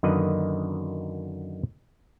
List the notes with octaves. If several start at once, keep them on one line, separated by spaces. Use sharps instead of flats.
F#2 D3 D#3 A#3 B4 D#5